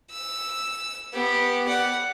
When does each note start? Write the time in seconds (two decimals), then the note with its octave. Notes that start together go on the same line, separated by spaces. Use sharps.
0.11 E6
1.13 B3 G4
1.68 D5 F#5